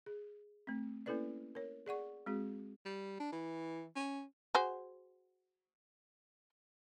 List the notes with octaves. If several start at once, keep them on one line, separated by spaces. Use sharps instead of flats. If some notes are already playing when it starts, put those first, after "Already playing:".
G#4
A3 C4
A#3 C#4 E4 A4 B4 D5
A#4 C#5
G#4 D5 F#5 C#6
G#3 C4 F#4 G#4
G3
D4
E3
C#4
F#4 G#4 C5